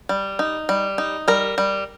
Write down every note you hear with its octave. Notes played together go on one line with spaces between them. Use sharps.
G3
D#4
G3
D#4
G3 A#4
G3